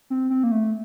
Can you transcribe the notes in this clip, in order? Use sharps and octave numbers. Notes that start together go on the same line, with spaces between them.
C4
C4
A#3
A3